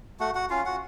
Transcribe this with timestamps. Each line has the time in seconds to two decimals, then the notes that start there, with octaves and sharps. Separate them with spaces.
0.20 A3 F#4 F#5
0.35 F#4 F#5
0.50 C#4 F4 F5
0.65 F#4 F#5